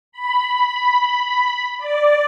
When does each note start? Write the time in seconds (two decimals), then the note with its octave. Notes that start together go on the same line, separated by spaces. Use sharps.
0.12 B5
1.78 D5